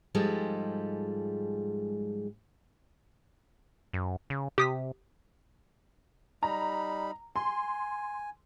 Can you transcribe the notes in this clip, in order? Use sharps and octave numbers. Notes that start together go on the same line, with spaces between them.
G#2 F3 G3 G#3 F4 A4
F#2
C#3
C3 G4 D#6 B6
G3 D#4 A#5 B5
G#5 C6